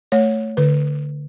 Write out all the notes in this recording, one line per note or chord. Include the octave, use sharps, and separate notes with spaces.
A3 C#5
D3 B4